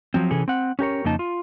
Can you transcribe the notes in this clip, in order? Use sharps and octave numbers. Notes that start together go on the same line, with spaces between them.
F3 F#3 C4
C3 E3 C#4 G#4 A4
C4 F#5
C#4 G4 A#4 C#5
F2 C#3 A#3 D#4 D#5 A5
F4